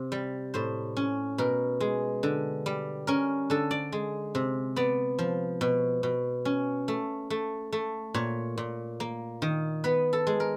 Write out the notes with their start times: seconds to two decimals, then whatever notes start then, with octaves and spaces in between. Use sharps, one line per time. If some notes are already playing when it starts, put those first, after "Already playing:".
Already playing: C3
0.12 G3
0.54 A2 C5
0.97 C#4
1.38 B2 A#4
1.80 G#3
2.23 D3
2.66 G3
3.07 C#4 A#4
3.50 D3 A4
3.71 D5
3.92 G#3
4.35 C3
4.76 B3 D5
5.19 F3
5.61 B2
6.03 B2
6.45 C#4
6.88 A3
7.30 A3
7.72 A3
8.14 A#2 C#5
8.58 A#2
9.00 A#3
9.42 D#3
9.84 B3 B4
10.13 A4
10.27 G#3
10.40 A#4